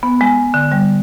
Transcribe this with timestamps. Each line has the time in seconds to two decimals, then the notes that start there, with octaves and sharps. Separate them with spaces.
0.03 B3
0.21 G#3
0.54 D3
0.72 G3